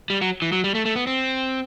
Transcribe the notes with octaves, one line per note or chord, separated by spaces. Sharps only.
G3
F#3
E3
F#3
G3
A3
A3
B3
C4